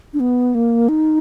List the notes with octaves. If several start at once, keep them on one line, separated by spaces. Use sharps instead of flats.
D4
B3
A#3
D#4